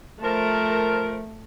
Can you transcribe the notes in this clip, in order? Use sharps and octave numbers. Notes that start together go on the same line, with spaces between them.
F3 A3 A#4 A5